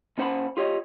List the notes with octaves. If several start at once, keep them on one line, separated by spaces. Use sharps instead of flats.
A#2 C#4 C5 F#5 A5 B5
F4 G4 C#5 D#5